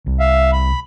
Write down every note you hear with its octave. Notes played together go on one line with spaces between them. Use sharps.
C2
E5 F5
B5